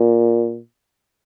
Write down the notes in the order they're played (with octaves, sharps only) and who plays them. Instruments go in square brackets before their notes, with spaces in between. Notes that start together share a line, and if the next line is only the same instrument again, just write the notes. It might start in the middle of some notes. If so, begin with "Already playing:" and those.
Already playing: [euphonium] A#2